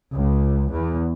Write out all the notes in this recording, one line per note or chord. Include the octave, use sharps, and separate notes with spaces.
C#2
E2